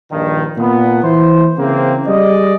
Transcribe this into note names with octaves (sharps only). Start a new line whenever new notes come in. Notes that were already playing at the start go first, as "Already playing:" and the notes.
A#1 G2 D#3
A#2 B3
E3 C5
C#3 E3 A#3 C4
G3 G#4 D5 D#5